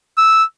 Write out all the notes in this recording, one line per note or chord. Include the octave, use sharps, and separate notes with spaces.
E6